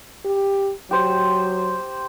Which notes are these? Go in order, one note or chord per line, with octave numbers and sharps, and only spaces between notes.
G4
F#3 G4 C5